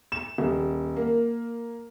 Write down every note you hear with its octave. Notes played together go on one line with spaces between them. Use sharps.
E7
D#1
A#3